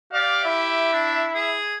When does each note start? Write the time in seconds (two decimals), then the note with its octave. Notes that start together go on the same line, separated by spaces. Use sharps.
0.13 G4 D5 F5
0.44 E4 E5
0.93 D4
1.34 G#4